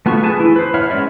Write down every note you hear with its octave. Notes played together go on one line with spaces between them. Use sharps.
A3 B3 F4 F#4 C#6
G#4 B4 G#5 A5
E3 E4
B4 C5
C#5 E5 F#5 B5 F6
G#3 C#4 C#5 D5 E5